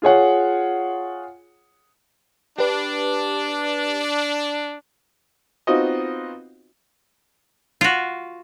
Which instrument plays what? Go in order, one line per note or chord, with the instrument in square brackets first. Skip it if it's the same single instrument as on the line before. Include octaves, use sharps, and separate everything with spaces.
[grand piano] F4 G#4 C#5 F#5
[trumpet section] D4 [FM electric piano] G4 B4
[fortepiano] B3 C4 D#4 F4 F#4 D#5
[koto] F4 F#4